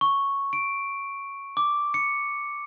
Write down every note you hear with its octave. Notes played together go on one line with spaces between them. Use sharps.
C#6
D7
D6
C#7